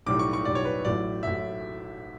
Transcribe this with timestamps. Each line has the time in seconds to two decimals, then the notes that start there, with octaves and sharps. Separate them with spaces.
0.06 B1 A2 G3 D6
0.19 C#6
0.33 C#6
0.45 B1 A2 G3 D5
0.55 C#5
0.65 B4
0.85 A1 A2 F#3 D5
1.23 A1 A2 F#3 E5